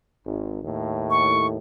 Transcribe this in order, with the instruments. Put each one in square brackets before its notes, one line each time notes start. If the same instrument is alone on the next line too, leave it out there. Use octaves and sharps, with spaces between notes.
[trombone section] G#1
D#2 A2
[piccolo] C#6